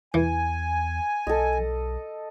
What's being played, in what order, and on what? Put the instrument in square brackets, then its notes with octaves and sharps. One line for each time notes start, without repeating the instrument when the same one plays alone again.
[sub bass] E2 [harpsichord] E3 [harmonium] G#5
[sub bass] B1 [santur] A4 D#5